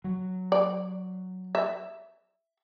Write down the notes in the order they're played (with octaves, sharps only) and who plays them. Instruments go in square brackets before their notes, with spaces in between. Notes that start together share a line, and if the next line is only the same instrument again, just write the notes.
[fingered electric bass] F#3
[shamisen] D5
E5